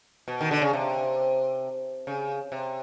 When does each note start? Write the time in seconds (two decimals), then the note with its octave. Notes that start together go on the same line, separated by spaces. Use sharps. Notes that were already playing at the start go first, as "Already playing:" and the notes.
0.28 B2
0.41 D#3
0.51 D3
0.62 C#3
0.73 C3
2.07 C#3
2.52 C3